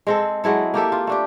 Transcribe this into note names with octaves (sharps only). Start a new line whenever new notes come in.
G#3 C4 A4
F#3 G#3 E4 A4
A#3 G4 A4 E5
F4
A3 D4 G4